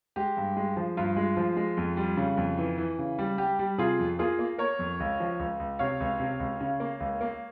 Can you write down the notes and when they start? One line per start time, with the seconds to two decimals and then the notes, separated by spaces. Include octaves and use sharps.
0.16 G#3 G4
0.37 G2
0.56 G#3
0.76 F3
0.97 G2 F4
1.16 G#3
1.36 F3
1.57 G#3
1.77 F2
1.97 G3
2.17 C#3
2.37 F2
2.58 E3
2.77 E3
2.98 C#3
3.19 G3
3.38 G3 G4
3.59 G3
3.78 C3 F4 G#4
3.99 F2
4.19 A#3 F4 G#4
4.39 A#3
4.58 A#3 A#4 C#5
4.79 F2
5.00 C#2
5.20 F3
5.39 C#2
5.59 C#2
5.79 C3 C#5 F5
6.00 C#2
6.19 C3
6.40 C#2
6.61 C#3
6.80 A#3
7.00 C#2
7.21 A#3